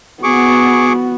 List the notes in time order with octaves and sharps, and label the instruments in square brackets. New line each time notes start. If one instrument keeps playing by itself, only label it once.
[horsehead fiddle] B3 F#4 [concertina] G#4 C#6 D6